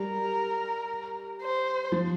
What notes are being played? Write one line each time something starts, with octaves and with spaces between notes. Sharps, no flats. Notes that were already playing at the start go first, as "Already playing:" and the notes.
Already playing: G3 A#4
C5
F3